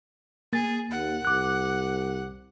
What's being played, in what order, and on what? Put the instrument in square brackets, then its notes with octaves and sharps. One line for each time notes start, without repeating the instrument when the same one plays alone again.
[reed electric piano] A#3 A6 [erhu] G#4
[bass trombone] D#2 [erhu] F#5
[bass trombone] C2 [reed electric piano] D6 F#6